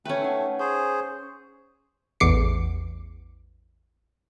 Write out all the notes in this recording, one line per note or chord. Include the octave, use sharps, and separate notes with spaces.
A3 C#4 B4 G5
D#4 F#5
G#4 C5 C#6
A1 E2 D6 C7 C#7